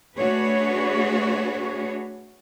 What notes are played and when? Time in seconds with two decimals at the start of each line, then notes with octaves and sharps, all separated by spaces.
0.16 A3 D4 F#4 G#4 B4 C#5